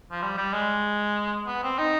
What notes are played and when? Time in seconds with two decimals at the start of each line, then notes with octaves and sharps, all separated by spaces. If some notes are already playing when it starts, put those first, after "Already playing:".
0.11 F3
0.22 G3
0.38 G3
0.53 G#3
1.47 B3
1.63 C4
1.79 D#4